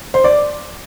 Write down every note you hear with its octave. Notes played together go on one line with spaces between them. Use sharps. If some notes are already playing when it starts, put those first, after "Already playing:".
C5
D5